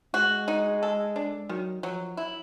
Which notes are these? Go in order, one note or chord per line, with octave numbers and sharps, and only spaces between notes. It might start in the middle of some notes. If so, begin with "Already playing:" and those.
G#3 F#4
D#4
A4
D4
D#3 F#3
F3 F#3
E4